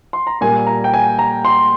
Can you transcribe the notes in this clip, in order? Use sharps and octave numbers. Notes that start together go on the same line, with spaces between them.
C6
A#5
A#2 G3 A#3 G#5
A#5
G5
G#5
A#5
C6